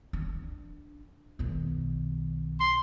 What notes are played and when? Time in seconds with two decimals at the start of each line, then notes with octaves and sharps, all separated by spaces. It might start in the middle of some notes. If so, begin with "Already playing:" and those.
0.13 D4
1.39 B1 D#3
2.60 C6